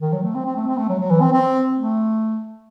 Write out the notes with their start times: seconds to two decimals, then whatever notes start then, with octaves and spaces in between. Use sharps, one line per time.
0.02 D#3
0.12 F#3
0.23 A3
0.35 C4
0.45 C4
0.56 A3
0.67 C4
0.78 A3
0.89 F#3
1.00 F#3
1.10 E3
1.21 C4
1.33 C4
1.76 A3